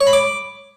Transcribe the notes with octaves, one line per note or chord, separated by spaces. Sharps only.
C#5
B5
D6